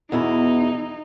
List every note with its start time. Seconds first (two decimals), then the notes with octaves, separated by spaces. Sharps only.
0.12 E2 B2 D#4 E4